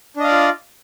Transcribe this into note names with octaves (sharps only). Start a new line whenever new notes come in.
D4 F4 D5 D#5 F5